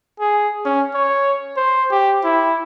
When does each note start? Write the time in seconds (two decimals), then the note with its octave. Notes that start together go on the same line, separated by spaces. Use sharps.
0.20 G#4
0.65 C#4
0.95 C#5
1.56 C5
1.91 G4
2.24 E4